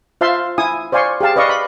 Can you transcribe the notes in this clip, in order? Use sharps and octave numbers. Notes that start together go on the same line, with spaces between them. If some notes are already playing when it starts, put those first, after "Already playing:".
F4 C5 E5 F5 A5 C6
E4 G#5 D#6
C5 D5 F5 G#5 C6 C#6
G4 G#4 F5 A5
B4 D5 D#5 F5 C#6
B5